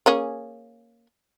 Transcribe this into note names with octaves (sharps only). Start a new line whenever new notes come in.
A#3 C#4 G#4